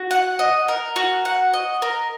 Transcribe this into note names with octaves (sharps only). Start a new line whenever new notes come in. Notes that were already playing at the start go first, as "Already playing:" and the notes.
Already playing: F#4
F#5
D#5
A#4
F#4
F#5
D#5
A#4